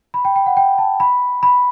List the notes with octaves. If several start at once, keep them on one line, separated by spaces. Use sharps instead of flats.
B5
G5
G5
F#5
G5
A5
B5
B5